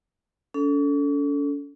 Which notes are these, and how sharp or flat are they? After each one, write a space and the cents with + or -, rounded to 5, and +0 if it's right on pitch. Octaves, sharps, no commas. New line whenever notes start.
C#4 +45 A4 +5